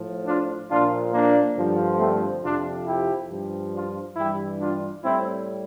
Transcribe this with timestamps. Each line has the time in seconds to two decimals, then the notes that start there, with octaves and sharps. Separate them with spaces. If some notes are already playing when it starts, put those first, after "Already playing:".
Already playing: A2 F3
0.26 D4 F4
0.69 A#2 F3 D4 F4
1.13 A#3 D4
1.56 G2 D3 F3
1.99 A3 C4
2.43 F2 C3 F3 D4 F4
2.86 E4 G4
3.30 G2 F3
3.73 D4 F4
4.16 G2 E3 G3 E4 G4
4.59 D4 F4
5.03 A2 G3 C4 E4